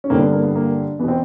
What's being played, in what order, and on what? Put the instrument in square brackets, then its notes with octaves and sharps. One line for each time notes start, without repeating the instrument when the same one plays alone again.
[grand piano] C#4
G2 D3 A#3 C4
B3
A#3
B3
A#3
E2 B2 B3
C4